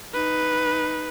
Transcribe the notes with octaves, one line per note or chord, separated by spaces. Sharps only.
D#4 B4